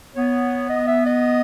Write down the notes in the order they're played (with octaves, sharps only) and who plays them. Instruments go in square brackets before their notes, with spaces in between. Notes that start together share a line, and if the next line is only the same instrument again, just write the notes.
[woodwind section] B3 [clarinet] C#5
[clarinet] D#5
E5
D#5